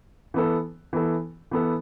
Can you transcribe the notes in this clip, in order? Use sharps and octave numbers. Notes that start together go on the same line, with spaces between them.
E3 B3 A4
E3 B3 A4
E3 B3 A4